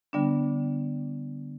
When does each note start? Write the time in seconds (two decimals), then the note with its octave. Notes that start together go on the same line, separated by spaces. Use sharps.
0.13 D3 G3 B3 D4